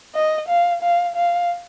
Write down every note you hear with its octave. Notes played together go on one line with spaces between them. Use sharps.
D#5
F5
F5
F5